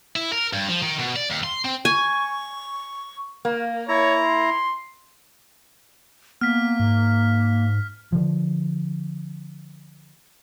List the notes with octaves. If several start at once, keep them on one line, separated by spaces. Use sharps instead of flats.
E4
A#4
G2
F3
D#3
B2
D5
D#2
C6
C4
G#5 C#6
A#3
E4 C#5 A#5
C6
A#3 B3 F6 B6
G#2
D3 F3